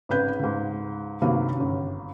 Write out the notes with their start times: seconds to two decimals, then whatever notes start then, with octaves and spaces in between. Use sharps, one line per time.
0.09 G#1 C#3 B4 G6
0.39 C#2 G#2
1.22 G2 C3 D#3 F#3 A#3
1.56 G1 F#2